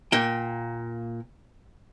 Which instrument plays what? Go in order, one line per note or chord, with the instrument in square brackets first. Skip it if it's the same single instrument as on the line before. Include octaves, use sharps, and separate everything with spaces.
[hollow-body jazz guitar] A#2 A#3 G5